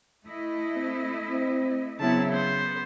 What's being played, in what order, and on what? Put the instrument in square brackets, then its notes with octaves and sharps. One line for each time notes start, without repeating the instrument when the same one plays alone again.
[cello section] A3 E4 D#5
[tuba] C4
C4
[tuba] C#3 [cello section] F#3 C4 E4 [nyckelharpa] B3 A5
[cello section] B3 [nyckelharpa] C5